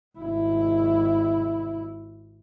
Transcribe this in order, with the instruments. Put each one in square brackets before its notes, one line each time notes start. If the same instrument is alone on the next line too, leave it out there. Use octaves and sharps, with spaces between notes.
[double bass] G#1 E4